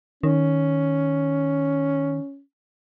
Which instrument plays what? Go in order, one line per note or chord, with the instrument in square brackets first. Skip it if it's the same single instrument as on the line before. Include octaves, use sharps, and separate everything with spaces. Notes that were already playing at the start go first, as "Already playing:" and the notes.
[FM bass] D#3 [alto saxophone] C#4